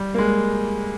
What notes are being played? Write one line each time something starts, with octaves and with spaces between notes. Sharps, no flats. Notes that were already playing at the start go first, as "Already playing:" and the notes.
Already playing: G3
A#3
G#3